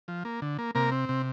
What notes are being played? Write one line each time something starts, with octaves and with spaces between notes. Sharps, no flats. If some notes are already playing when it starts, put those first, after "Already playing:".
F3
A#3
D3
A#3
C3 A#3 A#4
C4
C3